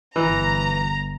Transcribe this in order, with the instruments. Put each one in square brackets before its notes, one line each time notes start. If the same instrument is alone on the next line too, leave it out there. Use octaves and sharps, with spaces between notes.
[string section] G1 A#5 [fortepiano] E3